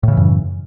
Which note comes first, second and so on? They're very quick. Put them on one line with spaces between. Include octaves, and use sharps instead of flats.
A2 C#3 E3 F#2